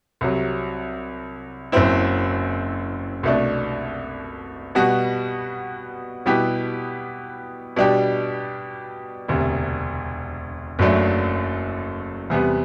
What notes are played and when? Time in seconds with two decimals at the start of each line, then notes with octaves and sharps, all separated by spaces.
0.21 C2 C3 F#3
1.72 F#1 F#2 F#3 C4 E4
3.23 C2 B2 A3 D4
4.75 B2 G3 B3 F#4
6.26 B2 G3 B3 E4 G4
7.76 B2 G3 D4 G4
9.28 E1 D2 C3
10.79 F#1 F#2 F#3 A3 D4
12.30 E2 C3 G3 B3